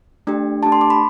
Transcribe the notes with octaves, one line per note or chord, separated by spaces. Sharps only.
A3 D4 G4
A3 D4 G4 A5
C6
D6
B5